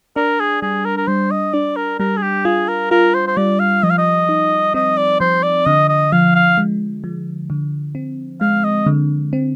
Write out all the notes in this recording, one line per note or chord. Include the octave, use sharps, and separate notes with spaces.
D4 A#4
G#4
G3 G#4
A#4
A#4
G3 C5
D#5
D4 D5
A#4
G3 A#4
G#4
G4
F4 G#4
A#4
F4 A#4
C5
C5
G3 D5
F5
F3 D#5
F5
D#5
D#4
C4 D#5
D5
F3 C5
D5
D3 D#5
D#5
F3 F5
F5
G#3
F3
D3
C4
G#3 F5
D#5
D3
C4